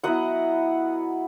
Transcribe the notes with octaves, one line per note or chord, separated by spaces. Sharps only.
F#3 B3 E4 D#5 F#5